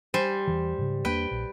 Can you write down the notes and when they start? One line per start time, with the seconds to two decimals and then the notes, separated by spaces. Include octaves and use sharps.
0.14 G3 C5 G#5
0.47 E2 E3
0.78 G#2 C#3
1.05 E2 A#3 D4 B4 G5
1.31 A#1